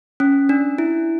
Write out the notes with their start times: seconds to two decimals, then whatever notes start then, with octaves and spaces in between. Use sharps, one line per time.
0.20 C#4
0.49 D4
0.78 E4